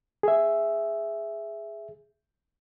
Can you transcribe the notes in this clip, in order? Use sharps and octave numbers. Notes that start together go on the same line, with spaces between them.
G#4 E5